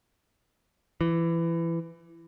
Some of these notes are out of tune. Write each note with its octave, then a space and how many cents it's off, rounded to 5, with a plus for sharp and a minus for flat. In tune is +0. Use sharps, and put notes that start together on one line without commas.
E3 +20